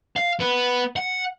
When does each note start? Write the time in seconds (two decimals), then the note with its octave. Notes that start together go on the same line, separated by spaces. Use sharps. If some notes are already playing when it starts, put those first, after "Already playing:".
0.16 F5
0.40 B3
0.96 F#5